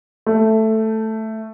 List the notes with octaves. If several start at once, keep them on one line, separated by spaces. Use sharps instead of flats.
A3